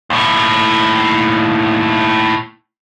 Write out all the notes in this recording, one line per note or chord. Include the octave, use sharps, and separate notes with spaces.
D#2 A2